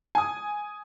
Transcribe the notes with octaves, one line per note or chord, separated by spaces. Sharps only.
G#5 D#6